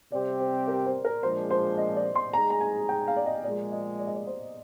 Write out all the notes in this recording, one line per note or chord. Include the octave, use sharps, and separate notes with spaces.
C3 G3 C4 G4 D5
C5
A#4
C5
A#4
A#2 F3 G#3 D4 C5
C5
D#5
D5
C6
G#3 D#4 G#4 A#5
A#5
G#5
G5
F5
D5
D#5
A#2 F3 G#3 D5
D#5
D5
D#5
D5
C5